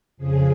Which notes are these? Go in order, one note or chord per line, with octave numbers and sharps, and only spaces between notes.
F2 C#3 F3 G#4